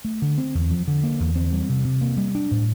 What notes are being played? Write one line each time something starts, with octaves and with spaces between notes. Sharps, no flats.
A3
D3
C4
E2
F3
D3
A#3
E2
C4
G3
C3
C3
A#3
G3
D4
A2